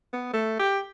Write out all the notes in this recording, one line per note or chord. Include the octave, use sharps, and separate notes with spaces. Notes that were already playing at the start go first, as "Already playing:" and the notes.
B3
A3
G4